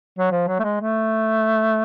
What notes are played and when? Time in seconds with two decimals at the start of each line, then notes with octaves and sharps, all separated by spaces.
0.18 F#3
0.31 F3
0.48 F#3
0.59 A3
0.64 G#3
0.81 A3